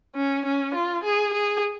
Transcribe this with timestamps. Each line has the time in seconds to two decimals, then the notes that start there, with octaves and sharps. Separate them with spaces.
0.16 C#4
0.45 C#4
0.74 F4
1.04 G#4
1.33 G#4